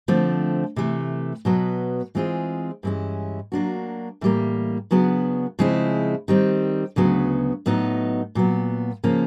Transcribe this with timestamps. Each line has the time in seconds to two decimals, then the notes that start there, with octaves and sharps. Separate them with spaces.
0.08 D3 F3 A3 C4
0.76 C3 E3 A3
1.45 B2 F#3 B3
2.15 E3 G#3 C4 F4 G#4
2.83 G2 E3 G#3 C#4 E4
3.52 F#3 A#3 D4 F#4
4.21 A2 E3 G3 A#3
4.91 C#3 F#3 B3 D4
5.59 C#3 F3 G#3 C4 E4
6.28 D#3 G3 C4
6.96 D2 C#3 F#3 B3
7.66 A2 F#3 B3 D#4
8.35 A#2 F#3 B3
9.04 C#3 F3 A#3 C#4